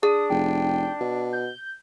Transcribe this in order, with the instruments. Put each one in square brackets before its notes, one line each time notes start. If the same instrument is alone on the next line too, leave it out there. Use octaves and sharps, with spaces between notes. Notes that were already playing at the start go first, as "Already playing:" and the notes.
[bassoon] D4 [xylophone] G#4 [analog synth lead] D#6
[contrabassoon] F1 [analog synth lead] G5
[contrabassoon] B2
[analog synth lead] G6